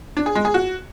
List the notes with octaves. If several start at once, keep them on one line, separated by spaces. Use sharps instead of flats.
D4
G#4
G#3
G#4
F#4